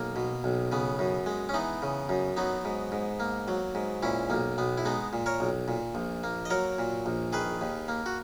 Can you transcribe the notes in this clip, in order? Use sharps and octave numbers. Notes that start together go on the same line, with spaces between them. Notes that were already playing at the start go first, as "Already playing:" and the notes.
Already playing: B1 A#3
B2
B1
C#3 B3
F#2
G#3
C#4
E3 B3 D#4
C#3
F#2
F#3 B3 D#4
G#2
G#2
A#3
F#3
G#2
A#2 C#4 E4
B1 A#3
B1 B3
E4
G#3 B3 D#4
A#2
A#4 C#5
B1
A#2
A#1
A#3
D#5
F#3 A#4 C#5
A#2
A#1
D#3 G#4 B4
D#2
A#3
F#4